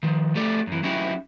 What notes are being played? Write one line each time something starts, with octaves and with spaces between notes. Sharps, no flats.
D#3 F3
A3 G4 A4 D5
F#2 E3
F#3 C#4 D#4 E4 G4